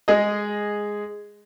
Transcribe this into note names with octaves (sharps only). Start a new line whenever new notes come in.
G#3 G#4 D#5